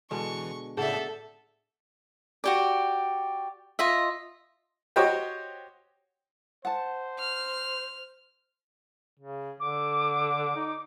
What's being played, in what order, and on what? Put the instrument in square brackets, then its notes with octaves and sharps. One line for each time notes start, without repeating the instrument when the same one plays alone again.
[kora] B2 D3 G#3 [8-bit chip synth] E3 [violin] C#6
[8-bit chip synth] A2 C#3 D5 [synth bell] G#4 F#5 [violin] A4 E5
[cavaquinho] F#4 G4 D5
F4 D#5 E5
[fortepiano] F#4 G4 C5 C#5 D#5 G5
[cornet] C5 [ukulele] F#5 A5
[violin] F6
[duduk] C#3
[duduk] D3 [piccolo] D6
[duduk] D#4